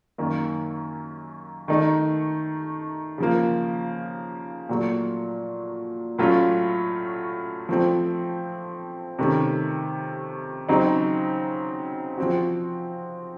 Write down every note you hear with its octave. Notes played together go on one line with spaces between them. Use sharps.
F#2 D#3 A#3
D#3 A3 D#4
C#3 F3 A#3
A#2 F#3 A3
A2 F#3 A3 C#4 F4
F3 A3 C4
C3 D#3 A3 C#4
C#3 F#3 C4 D#4
F3 C4 F#4